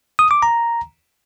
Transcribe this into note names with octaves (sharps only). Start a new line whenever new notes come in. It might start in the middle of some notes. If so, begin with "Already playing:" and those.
D#6
D6
A#5